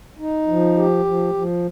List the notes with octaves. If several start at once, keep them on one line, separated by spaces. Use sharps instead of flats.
D#4
F3
G4
F3
F3